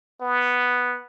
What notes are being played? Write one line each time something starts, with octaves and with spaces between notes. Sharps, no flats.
B3